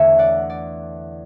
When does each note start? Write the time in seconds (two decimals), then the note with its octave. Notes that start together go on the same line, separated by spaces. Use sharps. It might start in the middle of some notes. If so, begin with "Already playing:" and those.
Already playing: E2 D3 A3 C#5 E5
0.18 D5 F#5
0.50 D5